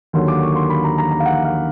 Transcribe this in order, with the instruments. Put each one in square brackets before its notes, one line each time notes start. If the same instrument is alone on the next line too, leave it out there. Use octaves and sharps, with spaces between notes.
[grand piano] D#2 D3 F#3 A#3 C6
D6
C#6
C6
B5
A#5
A#5
A#5
F5
F#5
F5